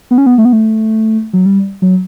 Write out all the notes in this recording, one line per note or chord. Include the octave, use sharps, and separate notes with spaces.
B3
C#4
B3
A3
B3
A3
F#3
G3
F#3